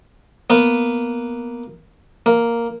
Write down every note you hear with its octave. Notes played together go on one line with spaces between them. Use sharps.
A#3 B3
A#3